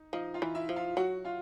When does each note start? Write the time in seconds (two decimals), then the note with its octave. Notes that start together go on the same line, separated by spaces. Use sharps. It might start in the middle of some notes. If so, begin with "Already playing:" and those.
Already playing: D#4
0.13 F3 D#4 D#5
0.34 F4 F5
0.42 E3
0.55 E4 E5
0.69 F3
0.76 F4 F5
0.97 F#3 F#4 F#5
1.25 F4 F5